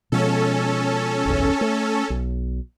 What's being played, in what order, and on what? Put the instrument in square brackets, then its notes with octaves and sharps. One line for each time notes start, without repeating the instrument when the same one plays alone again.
[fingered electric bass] B2 F3 G#3 [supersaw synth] C#4 A4
[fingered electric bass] F#1 B1 E2
A3
B1